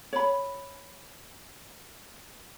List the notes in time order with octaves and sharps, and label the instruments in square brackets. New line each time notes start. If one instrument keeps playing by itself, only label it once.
[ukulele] C#5 B5